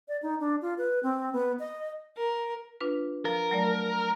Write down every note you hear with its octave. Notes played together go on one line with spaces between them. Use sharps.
D5
D#4
D4
F4
B4
C4
B3
D#5
A#4
D4 F4 B4
F3 A#4
F#3 A3 D5